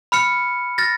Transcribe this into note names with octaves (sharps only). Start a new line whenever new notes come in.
B5 F6 C#7
F6 A6 A#6